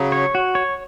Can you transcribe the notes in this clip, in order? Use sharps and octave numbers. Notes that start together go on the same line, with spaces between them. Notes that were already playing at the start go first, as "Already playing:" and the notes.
Already playing: C#3 F#3
C#5
F#4
C#5